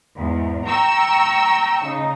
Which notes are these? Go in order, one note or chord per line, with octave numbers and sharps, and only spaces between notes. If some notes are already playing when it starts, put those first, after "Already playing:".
E2 G#2
G5 A#5 C#6 E6
C#3 D#4